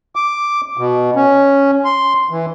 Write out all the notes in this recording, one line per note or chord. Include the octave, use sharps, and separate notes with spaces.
D6
B2
C#4
C6
E3